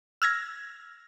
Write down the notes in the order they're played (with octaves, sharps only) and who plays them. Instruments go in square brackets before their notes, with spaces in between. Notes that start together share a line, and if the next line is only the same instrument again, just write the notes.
[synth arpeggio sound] E6 F6 G#6 A#6